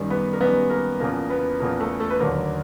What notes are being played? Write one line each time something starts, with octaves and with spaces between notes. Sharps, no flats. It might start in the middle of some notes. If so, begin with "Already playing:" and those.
Already playing: F#2 D#3 G3
B3 B4
A#4
F#2 D#3 G3 B3 B4
A#3 A#4
E2 C#3 F3 A#3 A#4
B3 B4
E2 C#3 F3 A#3 A#4
A3 A4
A3 A4
B4
D#2 D3 F#3 A#3 A#4